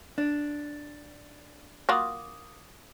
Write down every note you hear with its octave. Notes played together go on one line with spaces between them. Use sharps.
D4
A#3 F4 F#4 D6 D#6